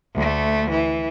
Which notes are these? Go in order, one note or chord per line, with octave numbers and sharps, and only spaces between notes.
D2 A3
E3